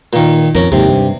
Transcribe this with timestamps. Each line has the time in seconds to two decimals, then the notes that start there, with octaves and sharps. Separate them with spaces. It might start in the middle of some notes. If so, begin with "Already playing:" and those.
0.13 A#2 D#3
0.55 F2 C#4 A#4
0.72 D#2 G#2 C3
0.89 G2